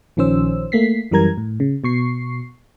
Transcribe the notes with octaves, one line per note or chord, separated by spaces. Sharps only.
A#1 D#3 F3 C#4 C5 E6
A3 A#3 B6 C7
F#2 E3 G3 A#4 A#5 G#6
A2
C#3
B2 C#6 C7